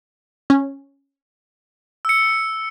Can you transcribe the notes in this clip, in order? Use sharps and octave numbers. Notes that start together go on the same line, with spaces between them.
C#4
E6 C#7